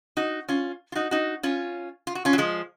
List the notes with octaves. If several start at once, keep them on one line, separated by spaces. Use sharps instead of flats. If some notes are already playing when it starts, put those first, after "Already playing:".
D#4 F#4
C#4 F4
F4
D#4 F#4
D#4 F#4
C#4 F4
F4
F#4
C#4 F4
F#3
F3 G#3